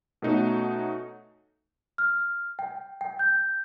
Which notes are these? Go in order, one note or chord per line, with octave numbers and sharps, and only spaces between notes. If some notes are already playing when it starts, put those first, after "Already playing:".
B2 A3 C#4 D#4 F#4
F6
G5
G5
G6